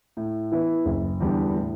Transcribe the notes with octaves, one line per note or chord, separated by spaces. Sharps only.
A2
E3 B3 E4
F#1
E2 D3 G3 B3
A2